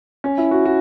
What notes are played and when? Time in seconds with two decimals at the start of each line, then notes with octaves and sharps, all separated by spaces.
0.24 C#4
0.38 E4
0.51 F#4
0.65 F#4